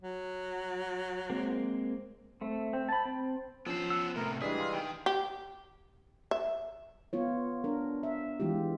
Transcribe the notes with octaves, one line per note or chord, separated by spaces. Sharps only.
F#3
G#3 A#3 C4
A3 C4
C4
A5 B5
C4
F3 B3 C#4 C5 E6
F#5 E6
A2 C3 A3 B3 A#4
E3 G3 G#3 D4 G#4 D#6 B6
F5 C6 F6
D#3 G5
G4
E5
B3 F4 C#5
D4 A#4
E5
E3 G#3 F4 G4